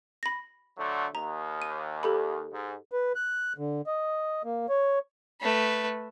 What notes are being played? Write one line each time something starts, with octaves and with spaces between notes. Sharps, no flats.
B5 A#6
D3 F#3 A3
D#2 A#5
D#7
G4 A4 B5
G#2
B4
F#6
D3
D#5
A#3
C#5
A3 B4